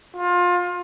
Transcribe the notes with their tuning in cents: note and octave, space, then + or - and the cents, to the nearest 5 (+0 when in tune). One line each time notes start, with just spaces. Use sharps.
F4 +25